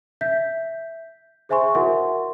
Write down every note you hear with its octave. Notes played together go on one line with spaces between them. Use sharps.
E5 G6 B6
G#4 C5 E5 G#5 C6 C#6
E4 F#4 A#4 E5 F#5 C6